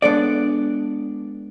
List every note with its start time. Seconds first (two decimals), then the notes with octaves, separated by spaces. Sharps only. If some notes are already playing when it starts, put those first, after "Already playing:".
0.02 G#3 B3 D4 A4 D5